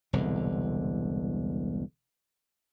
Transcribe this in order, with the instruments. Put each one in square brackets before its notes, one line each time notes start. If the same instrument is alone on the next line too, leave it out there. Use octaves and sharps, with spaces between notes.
[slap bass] E1 C2 D3